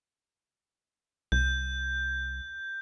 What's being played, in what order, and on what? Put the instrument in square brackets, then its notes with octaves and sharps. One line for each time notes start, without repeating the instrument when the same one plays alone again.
[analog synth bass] C2 [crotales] G6